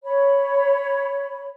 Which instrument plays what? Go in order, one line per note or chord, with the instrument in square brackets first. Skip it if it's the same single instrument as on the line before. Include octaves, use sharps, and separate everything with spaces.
[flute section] C#5 B5